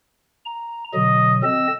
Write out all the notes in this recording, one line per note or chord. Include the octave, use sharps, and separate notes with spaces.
A#5
B2 D3 F#3 D#5
C4 A4 D#5 E6